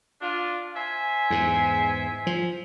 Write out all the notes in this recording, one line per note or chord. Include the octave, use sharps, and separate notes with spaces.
D4 F4
C5 E5 G#5
E2 G#2
F3